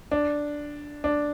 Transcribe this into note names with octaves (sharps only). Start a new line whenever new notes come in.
D4
D4